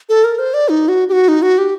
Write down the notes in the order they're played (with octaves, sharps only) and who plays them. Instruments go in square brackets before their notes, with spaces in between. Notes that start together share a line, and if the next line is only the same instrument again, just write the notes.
[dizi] A4
A#4
C5
D5
D#4
F#4
G4
F#4
D#4
F#4
G4